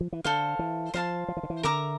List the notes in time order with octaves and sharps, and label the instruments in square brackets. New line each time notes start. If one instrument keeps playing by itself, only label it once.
[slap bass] F3
E3
[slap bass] D3 [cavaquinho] A4 C5 F5
[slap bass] E3
[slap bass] F3 [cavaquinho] C5 F5 A5 C6
[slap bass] F3
E3
D3
E3
[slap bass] D3 [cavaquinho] A#4 E5 A#5 D6